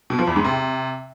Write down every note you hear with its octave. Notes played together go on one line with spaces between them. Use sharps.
B2
F3
E2
G#2
C3